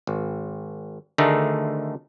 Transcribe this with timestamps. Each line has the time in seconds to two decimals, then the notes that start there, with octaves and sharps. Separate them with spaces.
0.07 G#1
1.18 D2 D3 D#3 A3 D#4 G#4